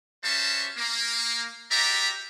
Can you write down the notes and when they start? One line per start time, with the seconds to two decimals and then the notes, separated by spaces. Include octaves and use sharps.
0.24 G3 C#4 F#4 C5 E5 A5
0.78 A#3
1.71 F#4 G4 D5 E5 A#5